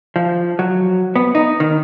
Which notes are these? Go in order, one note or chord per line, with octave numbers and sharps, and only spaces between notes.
F3
F#3
B3
D#4
D#3